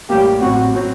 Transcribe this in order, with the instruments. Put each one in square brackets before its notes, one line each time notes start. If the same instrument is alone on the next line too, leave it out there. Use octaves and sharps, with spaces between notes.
[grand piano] A1 A2 G3 A#3 [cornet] G4
[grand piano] A1 A2 F#3 C4 [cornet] F#4
[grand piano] A2 F#3 C4